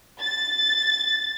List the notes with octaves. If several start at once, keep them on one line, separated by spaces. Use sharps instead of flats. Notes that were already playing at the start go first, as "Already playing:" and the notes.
A6